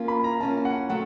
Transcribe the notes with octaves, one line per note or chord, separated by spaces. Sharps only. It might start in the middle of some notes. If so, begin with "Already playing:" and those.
Already playing: A#3 C#4 F4
B5
A#5
A#3 C#4 F4 A5
F#5
F#3 A3 F#5